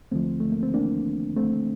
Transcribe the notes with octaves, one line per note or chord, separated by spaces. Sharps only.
D2 D3 F3 A3 C4
A3
A#3
C4
A#3 D4
A3 C4